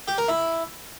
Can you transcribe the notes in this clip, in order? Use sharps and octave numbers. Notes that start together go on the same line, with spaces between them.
G4
A#4
E4